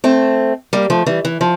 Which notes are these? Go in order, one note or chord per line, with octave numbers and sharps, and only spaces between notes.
A3 C4
G3 A#3
F3 A3
E3 G3
E3
F3